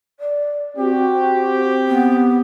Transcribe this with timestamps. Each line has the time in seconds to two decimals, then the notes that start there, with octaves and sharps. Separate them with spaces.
0.20 D5
0.77 C4 F#4 G4
1.88 B3